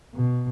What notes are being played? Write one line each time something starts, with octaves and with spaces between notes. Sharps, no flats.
B2